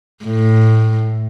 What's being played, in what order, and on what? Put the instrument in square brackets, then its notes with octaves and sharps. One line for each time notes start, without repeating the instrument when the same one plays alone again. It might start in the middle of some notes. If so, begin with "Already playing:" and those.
[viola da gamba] A2